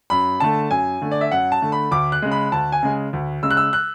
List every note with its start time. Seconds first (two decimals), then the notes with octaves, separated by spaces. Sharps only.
0.10 F#2 B5
0.40 D3 A3 A5
0.70 F#2 G#5
1.02 D3 A3
1.11 D5
1.21 E5
1.31 F#2 F#5
1.52 A5
1.62 D3 A3
1.72 B5
1.91 D2 D6
2.12 F#6
2.22 C#3 G#3
2.32 B5
2.52 D2 A5
2.72 G#5
2.83 C#3 G#3
3.13 D2
3.43 C#3 G#3 E6
3.50 F#6
3.57 E6
3.73 F#6